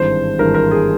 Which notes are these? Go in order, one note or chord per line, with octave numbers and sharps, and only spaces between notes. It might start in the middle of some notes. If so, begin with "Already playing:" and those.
Already playing: G#1 G2 E3 C5
G#1 G2 E3 A#4
A#4
G#4